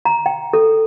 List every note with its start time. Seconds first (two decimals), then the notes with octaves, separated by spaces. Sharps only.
0.05 A#5
0.26 G5
0.53 A4